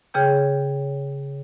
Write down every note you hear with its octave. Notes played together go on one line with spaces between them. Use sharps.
C#3 G#4 C#5 G5 G6